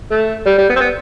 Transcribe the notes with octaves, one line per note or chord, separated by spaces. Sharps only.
A3
G3
G3
B3
C4
B3